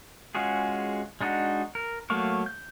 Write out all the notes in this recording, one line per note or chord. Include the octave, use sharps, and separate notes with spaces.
G#3 C#4 F4 F#4 G#4
G#3 D4 D#4 F#4
A#4
F#3 A3 A#3 F5 C#6
G6